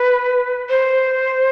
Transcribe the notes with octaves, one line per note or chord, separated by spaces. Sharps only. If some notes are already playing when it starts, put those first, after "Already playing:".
Already playing: B4
C5